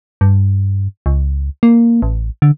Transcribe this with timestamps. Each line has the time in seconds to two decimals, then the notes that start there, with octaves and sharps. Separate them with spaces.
0.21 G2
1.06 C#2
1.63 A#3
2.02 A1
2.42 D3